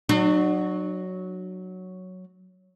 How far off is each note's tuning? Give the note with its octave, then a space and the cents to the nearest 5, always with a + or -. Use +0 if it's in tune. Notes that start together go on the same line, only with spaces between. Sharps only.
F#3 +0 D4 +45